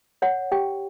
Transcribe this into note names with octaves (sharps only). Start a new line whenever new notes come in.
C#5 F#5
G4 G5